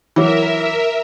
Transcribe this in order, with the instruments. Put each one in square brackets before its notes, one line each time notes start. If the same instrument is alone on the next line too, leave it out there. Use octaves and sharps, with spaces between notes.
[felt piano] E3 F#3 [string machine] A#4 E5